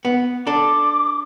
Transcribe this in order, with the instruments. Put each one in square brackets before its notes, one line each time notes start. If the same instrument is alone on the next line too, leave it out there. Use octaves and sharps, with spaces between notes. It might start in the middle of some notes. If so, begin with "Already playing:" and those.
[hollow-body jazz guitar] B3
[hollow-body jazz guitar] D4 A4 [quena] D6